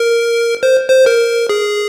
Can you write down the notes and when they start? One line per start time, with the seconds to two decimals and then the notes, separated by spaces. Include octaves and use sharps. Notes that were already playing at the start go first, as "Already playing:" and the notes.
Already playing: A#4
0.63 C5
0.90 C5
1.06 A#4
1.49 G#4